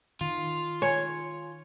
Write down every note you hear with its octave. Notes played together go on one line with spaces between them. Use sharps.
D#3 F4
C#5 G#5